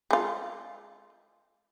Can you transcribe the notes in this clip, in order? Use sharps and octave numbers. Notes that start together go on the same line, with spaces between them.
G#3 F4